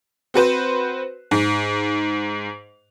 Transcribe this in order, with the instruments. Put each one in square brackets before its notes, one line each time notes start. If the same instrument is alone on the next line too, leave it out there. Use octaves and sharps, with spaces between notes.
[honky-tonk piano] C4 F#4 B4 C5
G#2